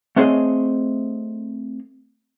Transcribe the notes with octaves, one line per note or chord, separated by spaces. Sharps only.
A3 B3 C4 G#4 C#5 D#5